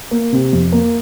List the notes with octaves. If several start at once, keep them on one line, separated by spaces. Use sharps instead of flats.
A#3
C3
F2
A#3